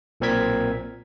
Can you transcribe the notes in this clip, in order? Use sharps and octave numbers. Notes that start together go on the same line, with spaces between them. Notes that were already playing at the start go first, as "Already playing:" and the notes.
B1 A#2 C4 A#4 G#6 B6